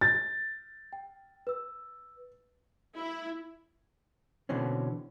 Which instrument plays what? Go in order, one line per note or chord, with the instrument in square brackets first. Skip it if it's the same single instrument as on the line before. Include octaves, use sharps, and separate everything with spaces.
[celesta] G6 [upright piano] A6
[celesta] G5
B4 E6
[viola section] E4
[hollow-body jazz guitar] B2 D3 E3 C4 C#4